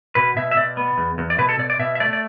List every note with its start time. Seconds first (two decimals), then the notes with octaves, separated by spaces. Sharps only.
0.15 B2 B4
0.36 B2 E5
0.51 E5
0.57 B2 D5
0.77 B3
0.98 E2
1.18 E2
1.30 D5
1.38 B2 B4
1.49 A4
1.59 B2 D5
1.70 D5
1.79 B2 E5
1.95 E5
2.00 A3 D5
2.13 D5